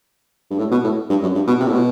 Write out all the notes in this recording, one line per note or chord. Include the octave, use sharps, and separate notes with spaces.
G2
A2
B2
A2
G2
F#2
G2
B2
C3
A2
B2